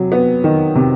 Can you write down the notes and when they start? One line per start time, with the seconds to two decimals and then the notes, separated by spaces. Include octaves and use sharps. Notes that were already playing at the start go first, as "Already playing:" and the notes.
Already playing: C3 F#3
0.12 B3
0.44 D#3
0.75 C3